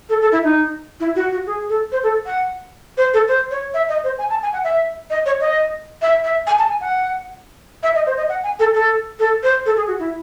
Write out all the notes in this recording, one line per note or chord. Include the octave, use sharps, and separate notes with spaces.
A4
A4
E4
D#4
E4
F#4
F#4
G#4
A4
C5
A4
F#5
C5
A4
C5
C#5
E5
D#5
C5
G#5
A5
G#5
F#5
E5
D#5
C#5
D#5
E5
E5
G#5
A5
G#5
F#5
E5
D#5
C5
D#5
F#5
G#5
A4
A4
A4
C5
A4
G#4
F#4
E4